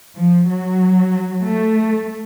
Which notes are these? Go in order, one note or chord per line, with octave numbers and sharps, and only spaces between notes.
F3
F#3
A3